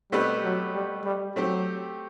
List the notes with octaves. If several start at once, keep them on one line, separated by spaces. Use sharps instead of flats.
B2 G3 A3 C4 G4 B4
F#3
G3
G3
F#3 A3 C4 G4